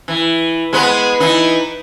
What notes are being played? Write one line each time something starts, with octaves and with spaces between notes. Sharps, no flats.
E3
G#3 B3
E3 D#4